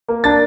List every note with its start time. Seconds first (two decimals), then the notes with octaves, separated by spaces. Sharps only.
0.08 A#3
0.24 D4 A6